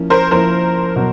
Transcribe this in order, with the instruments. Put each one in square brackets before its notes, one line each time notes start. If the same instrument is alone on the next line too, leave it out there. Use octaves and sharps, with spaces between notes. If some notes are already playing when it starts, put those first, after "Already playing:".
Already playing: [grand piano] F3 A#3 C#4 E4
[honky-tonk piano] A#4 C5
[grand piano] F3 A#3 C#4 E4 [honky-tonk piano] A#4 C5
[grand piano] B2 F#3